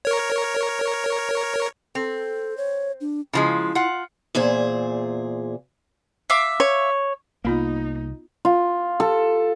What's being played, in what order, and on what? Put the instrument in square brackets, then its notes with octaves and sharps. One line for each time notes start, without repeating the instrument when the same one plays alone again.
[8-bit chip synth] A#4 C#5
[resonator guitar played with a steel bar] C4 [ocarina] A4
[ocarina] C#5
D4
[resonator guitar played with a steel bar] C#3 F3 G#3 [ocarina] E4
[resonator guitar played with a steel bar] F4 F#5
[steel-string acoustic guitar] E2 A#2 G#4 C5
[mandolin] E5 F5 D6
[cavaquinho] C#5
[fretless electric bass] C2 [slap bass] A#3 [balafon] B3 F4 B5 [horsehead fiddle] D#4
[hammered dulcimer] F4
A4